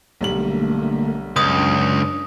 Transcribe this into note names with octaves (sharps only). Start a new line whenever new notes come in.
B1 D3 G3 A3 A#3 F#7
C#2 F#2 D4 D#6